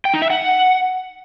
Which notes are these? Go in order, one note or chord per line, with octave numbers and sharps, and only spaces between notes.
G5
D#4
E5
F#5